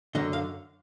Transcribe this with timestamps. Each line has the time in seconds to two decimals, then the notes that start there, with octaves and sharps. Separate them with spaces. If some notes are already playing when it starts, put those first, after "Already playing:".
0.15 F#2 D3 D#5
0.33 F5